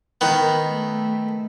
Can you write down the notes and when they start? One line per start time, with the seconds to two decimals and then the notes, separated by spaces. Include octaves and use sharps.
0.21 D#3 B3
0.68 A3